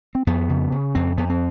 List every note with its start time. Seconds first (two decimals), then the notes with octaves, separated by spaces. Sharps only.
0.15 C4
0.27 F2 B3
0.49 C#3
0.72 C#3
0.95 F2 C4
1.18 F2 B3
1.29 C4